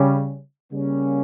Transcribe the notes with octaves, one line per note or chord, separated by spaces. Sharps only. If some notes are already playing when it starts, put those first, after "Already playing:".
Already playing: C#3 G3 C#4
C#3 G3 A#3 C#4